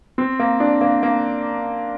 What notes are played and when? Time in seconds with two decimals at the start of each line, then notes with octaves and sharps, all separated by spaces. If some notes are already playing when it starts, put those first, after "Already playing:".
0.18 C4
0.40 A#3
0.60 D4
0.81 A#3
1.03 A#3